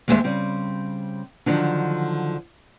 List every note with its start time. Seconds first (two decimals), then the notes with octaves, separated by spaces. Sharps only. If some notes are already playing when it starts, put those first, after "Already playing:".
0.08 D#2 G#3 A3 C#4 C5 E5
0.24 C#3 G3 C4
1.46 D3 D#3 F3 F#3 D4